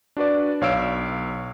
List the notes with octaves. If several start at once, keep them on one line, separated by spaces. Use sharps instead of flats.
D4 F#4 B4 D5
B1 C#5 F5 C#6 E6 D7